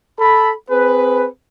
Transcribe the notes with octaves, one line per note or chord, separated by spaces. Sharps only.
A4 B5
C4 G#4 B4